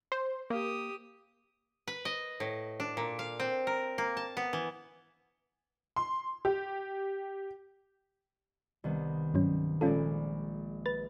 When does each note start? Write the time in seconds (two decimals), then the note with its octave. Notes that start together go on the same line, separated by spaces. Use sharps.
0.12 C5
0.50 A#3 G4 D#6
1.88 B4
2.05 D#5
2.40 A2
2.80 D4
2.97 A#2
3.19 F5
3.40 C4
3.67 A#4
3.98 A#3
4.17 A5
4.37 B3
4.53 E3
5.96 C6
6.45 G4
8.84 C2 D#3 B3
9.34 G2 F#3 C#4
9.81 A#1 G#3 C#4 F4 A4 D5
10.86 B4 A6